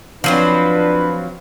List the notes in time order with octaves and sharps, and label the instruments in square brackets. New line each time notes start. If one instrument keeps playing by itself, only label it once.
[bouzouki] F3 F#3 C4 [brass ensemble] D4 B4